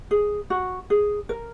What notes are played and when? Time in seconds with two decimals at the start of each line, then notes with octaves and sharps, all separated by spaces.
0.11 G#4
0.50 F#4
0.90 G#4
1.29 A#4